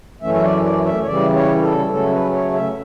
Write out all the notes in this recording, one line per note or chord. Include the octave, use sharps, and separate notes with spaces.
F#2 E3 A3 C#4 E5
E5
D5
D5
E5
C#5
C#3 E3 G3 D5
C#5
A4
C#3 F#3 A3 C#4 A4
B4
C#5
E5